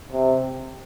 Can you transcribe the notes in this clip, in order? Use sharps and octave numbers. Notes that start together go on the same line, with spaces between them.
C3